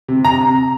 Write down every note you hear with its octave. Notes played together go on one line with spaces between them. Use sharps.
C3
A#5